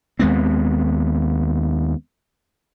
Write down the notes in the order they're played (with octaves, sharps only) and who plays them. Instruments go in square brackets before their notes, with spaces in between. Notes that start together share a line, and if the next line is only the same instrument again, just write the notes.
[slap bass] D#2 G#3 B3 C4